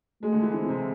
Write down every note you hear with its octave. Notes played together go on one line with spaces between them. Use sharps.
G#3 A3
D3
E3
E3 C4
C3